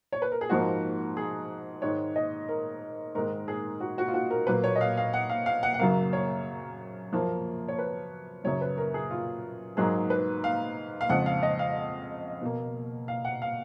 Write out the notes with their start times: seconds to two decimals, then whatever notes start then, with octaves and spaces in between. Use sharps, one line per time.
0.12 C#5
0.22 B4
0.32 A#4
0.41 G#4
0.50 G#2 F3 A#3 F#4
1.17 G#4
1.82 G#2 D#3 G#3 C#5
2.16 D#5
2.49 A#4
3.15 G#2 D#3 G#3 A#4
3.48 G#4
3.80 F#4
3.98 F#4
4.08 F4
4.14 F#4
4.30 A#4
4.47 A#2 F#3 A#3 B4
4.64 C#5
4.76 D#5
4.81 F5
4.97 F5
5.13 F#5
5.29 F5
5.46 F5
5.63 F#5
5.74 F#5
5.79 F#2 C#3 F#3 A#3 F5
6.13 C#5
7.13 F#2 F3 A#3
7.68 C#5
7.79 B4
8.44 F#2 C#3 F#3 C#5
8.61 B4
8.78 A#4
8.94 G#4
9.10 F4
9.77 G#2 F#3 A#3 G#4
10.10 B4
10.44 F5
11.01 F5
11.09 F2 C#3 G#3 F#5
11.26 F5
11.43 D#5
11.59 F5
12.41 B2 A#3
13.08 F5
13.25 F#5
13.42 F5